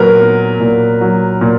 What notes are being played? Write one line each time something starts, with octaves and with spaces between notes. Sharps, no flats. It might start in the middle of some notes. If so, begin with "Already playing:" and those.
Already playing: A#2 F#3 A#4 B4
B3
A#2
F#3
A#2